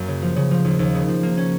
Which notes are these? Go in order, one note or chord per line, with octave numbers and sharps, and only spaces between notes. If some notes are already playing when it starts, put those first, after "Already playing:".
Already playing: F#2 A#3
C#3
F3
C#3
F3
D#2
D#2
C#3
F3
A#3
C#4